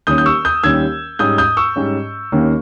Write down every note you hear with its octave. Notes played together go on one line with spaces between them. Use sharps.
D#2 D#3 G3 C#4 D#6 G6
G6
C#6 E6
D#6 G6
D#2 D#3 G3 C#4 E6 G#6
G#2 G3 C#4 D#6 G6
D#6 G6
C#6 E6
G#2 G3 C#4
D#2 D#3 A#3 C#4